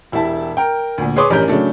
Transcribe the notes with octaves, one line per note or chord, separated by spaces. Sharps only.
E1 E4 G4 E5 A5
A#4 G5
D2 A#2
G#4 B4 C#5 C6 D6 D#6
A1 G2 G3 C#4 A#4 G6
C#3 F#3 A3 D4